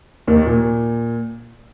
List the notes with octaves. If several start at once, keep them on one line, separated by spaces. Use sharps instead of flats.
D#2 D#3
A#2